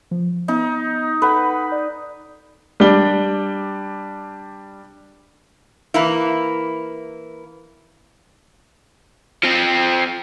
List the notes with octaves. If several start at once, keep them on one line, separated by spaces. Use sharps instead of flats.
F3
B3 D#4
A4 B4 F#5 B6
D5
G3 D4 G7
E3 A#3 E4
F3 C4